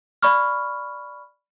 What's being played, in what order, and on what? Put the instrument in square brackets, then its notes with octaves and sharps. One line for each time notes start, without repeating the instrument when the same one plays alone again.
[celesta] D5 B5 C#6 F6